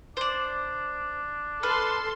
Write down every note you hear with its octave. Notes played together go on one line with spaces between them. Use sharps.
D4 C5 D5
A4 B4 C6 F6